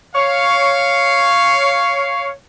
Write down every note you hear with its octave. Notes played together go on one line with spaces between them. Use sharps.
C#5 F5